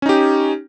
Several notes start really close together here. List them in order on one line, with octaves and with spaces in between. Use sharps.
C#4 D#4 G4